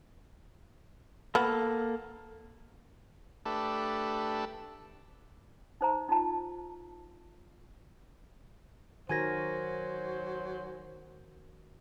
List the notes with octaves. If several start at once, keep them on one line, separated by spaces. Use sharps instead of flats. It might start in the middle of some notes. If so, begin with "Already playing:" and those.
A#3 B3 F#4 A4 F6
A3 D4 G4 A4 B4
D#4 C5 A#5
D#4 F4 A5
D#3 F#3 F#4 A#4 C5 G#5 G#6 A#6